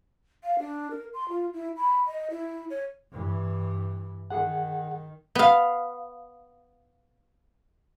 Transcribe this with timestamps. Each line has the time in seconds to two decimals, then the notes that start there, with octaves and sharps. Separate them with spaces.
0.43 F5
0.59 D4
0.91 A#4
1.14 C6
1.29 F4
1.54 E4
1.77 B5
2.07 D#5
2.30 E4
2.70 C#5
3.12 G2 E3
4.30 D#3 G#4 F#5
5.35 B3 F5